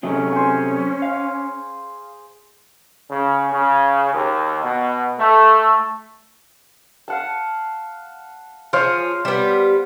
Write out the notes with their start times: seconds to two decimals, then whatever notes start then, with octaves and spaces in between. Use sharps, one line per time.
0.03 C3 F#3 A3 C#4 G#4
0.33 C5 G#5
1.02 F5
3.10 C#3
3.53 C#3
4.14 D#2
4.64 B2
5.19 A3
7.08 F5 F#5 A5
8.73 F3 G#4 C5 C#5 F5
9.25 G3 B3